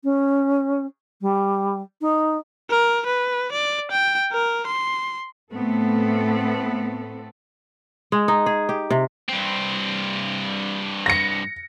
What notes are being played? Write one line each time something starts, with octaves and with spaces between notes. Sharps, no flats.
C#4
G3
D#4
A#4
B4
D5
G5
A#4
C6
A2 A3 B3 C4 A4
G#3
D#4
G#4
G4
C3
G2 C4
A#6 C#7